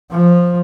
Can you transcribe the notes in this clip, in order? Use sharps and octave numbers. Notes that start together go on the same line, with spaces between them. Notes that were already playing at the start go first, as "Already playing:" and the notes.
F3